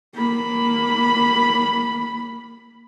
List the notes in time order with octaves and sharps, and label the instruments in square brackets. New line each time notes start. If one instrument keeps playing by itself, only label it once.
[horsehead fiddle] A#3 B5